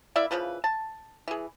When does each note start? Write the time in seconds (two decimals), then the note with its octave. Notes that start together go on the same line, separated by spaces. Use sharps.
0.16 A#3 E4 D5 E5
0.31 C#3 E3 F3 B4
0.64 A5
1.28 E3 G#4